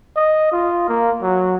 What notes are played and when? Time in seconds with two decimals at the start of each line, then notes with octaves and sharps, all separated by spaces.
0.16 D#5
0.52 F4
0.89 A#3
1.22 F#3